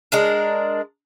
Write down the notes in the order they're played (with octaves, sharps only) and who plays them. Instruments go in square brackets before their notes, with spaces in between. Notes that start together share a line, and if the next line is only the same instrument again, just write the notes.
[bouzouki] G#3 D4 A#4